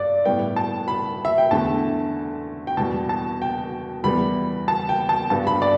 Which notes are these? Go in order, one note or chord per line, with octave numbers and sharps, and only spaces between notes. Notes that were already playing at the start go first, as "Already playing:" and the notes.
Already playing: G2 D5
A2 G3 B3 G5
A5
B5
E5
G5
E2 D3 A3 A5
G5
E2 B2 G3 A5
A5
G5
E2 E3 G3 B3 B5
A5
G5
A5
G2 G3 B3 A5
B5
D5